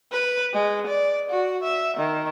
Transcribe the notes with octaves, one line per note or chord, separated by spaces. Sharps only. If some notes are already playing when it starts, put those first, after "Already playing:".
B4
G#3
D5
F#4
E5
D#3